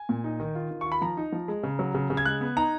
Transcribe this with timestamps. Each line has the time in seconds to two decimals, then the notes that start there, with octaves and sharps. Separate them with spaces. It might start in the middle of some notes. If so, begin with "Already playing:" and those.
Already playing: G#5
0.09 A#2
0.24 D#4
0.40 D#3
0.55 F4
0.71 D#3
0.81 C#6
0.86 F4
0.92 B5
1.01 F3 A#5
1.17 D#4
1.32 F3
1.48 G#3
1.63 C#3
1.79 F#3
1.94 C#3
2.10 C#3
2.17 G#6
2.25 G#3 F#6
2.41 B3
2.57 D#4 A#5